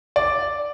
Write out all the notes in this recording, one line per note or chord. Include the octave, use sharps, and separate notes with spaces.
D5